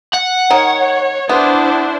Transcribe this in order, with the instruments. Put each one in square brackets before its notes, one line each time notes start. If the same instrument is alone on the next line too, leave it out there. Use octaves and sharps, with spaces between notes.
[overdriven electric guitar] F#5
[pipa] D#3 [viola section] C#5
[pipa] B3 [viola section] D4 E4 C5